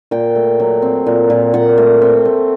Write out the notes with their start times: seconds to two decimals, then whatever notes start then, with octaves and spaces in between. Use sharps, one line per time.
0.11 A#2 G5
0.36 A3
0.60 F#3
0.82 C4
1.06 A#2
1.30 A#2
1.54 A#2 F#5
1.78 A3
2.02 C4
2.25 A3